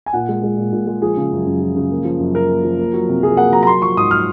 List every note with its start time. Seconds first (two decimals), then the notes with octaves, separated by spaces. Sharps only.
0.06 G#5
0.13 A#2 F#5
0.29 G#3
0.43 G#3
0.57 A#2
0.73 A#2
0.87 G#3
1.02 F3 G#4
1.17 C#3
1.32 F#2
1.47 F#2
1.61 F3
1.76 C#3
1.91 A#3
2.05 F3
2.19 F#2
2.34 F#2 A#4
2.49 A#3
2.64 F3
2.79 A#3
2.93 F#3
3.09 C3
3.22 C3 G#4
3.37 A#3 F#5
3.52 F#3 A#5
3.63 A#5
3.67 A#3 C6
3.82 F3 C#6
3.97 G#2 D#6
4.11 F6